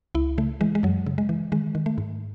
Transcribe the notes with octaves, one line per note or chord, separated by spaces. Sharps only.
C#2 E4
C#3 A3
E3 G#3
G#3
F#2 F#3
C#3
G#3
E3
D#3 G#3
D#3
A3
G#2